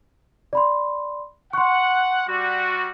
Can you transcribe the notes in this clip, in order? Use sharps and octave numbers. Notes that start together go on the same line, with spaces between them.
D5 B5 C6
F#5 C6 C#6
G3 F#4